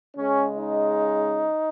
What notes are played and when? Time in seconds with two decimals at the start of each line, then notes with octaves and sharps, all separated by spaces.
0.16 C#3 G#3 C#4
0.57 D#4